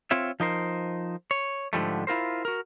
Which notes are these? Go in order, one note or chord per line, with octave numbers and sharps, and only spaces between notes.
C4 F4 C#5 E5
F3 D#4 A#4 C5
C#5
G#2 D3 F3 G3 A3
E4 F4 A#4 C5
F#4 A#4